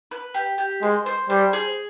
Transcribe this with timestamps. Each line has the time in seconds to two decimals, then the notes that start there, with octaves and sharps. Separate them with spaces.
0.11 B4
0.34 G4
0.58 G4
0.82 G#3 C5
1.06 C5
1.30 G3 C5
1.53 G#4